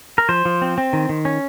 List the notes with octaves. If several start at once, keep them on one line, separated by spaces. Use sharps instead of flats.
A#4
F3 C5
F3
C4
C4
D#3
D#3
C#4